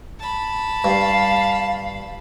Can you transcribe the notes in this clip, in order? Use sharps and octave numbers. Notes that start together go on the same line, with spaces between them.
A5 B5
G2 F5